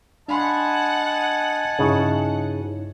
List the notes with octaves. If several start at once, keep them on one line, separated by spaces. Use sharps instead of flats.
D4 D#5 F#5 G#5 A5 B5 C6
G2 C#3 D#4 E4